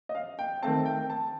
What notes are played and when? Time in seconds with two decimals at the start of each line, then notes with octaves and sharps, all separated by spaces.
0.09 D#5
0.15 F5
0.39 G5
0.62 D#3 A3 C4 A5
0.86 G5
1.10 A5